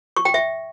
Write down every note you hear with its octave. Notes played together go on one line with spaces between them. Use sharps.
C#6
G5
E5